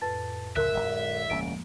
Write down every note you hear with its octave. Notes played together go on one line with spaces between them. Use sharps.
F2 A2 B4 A5 A6
C#2 C#3 F3 A#4 E5 F#6
D1 G1 G#3
E1 D2 F3 G#3 A#3 C#4 D7